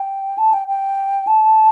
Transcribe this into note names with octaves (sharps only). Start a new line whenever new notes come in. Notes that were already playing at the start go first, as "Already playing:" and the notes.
Already playing: G5
A5
G5
G5
A5